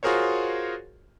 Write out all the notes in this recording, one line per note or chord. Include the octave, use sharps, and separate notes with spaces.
F4 F#4 G#4 A#4 C5 C#5